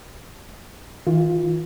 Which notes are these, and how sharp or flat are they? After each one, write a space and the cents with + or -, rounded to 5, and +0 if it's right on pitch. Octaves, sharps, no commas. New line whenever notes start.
E3 -40 F4 +10